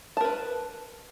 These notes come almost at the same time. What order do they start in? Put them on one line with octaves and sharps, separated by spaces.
A5 A#4 B4